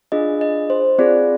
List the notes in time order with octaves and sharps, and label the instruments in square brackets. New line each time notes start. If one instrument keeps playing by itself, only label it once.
[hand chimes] D4 F4 G#4 D#5
D#5
C5
C4 F4 G#4 D5